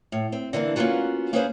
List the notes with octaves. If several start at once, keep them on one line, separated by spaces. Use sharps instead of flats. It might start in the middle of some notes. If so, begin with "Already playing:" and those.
A2
C4
D3 E3 A#3 D4
A#3 B3 C#4 F4 F#4
A#3 C#4 G#4 A4 B4 C5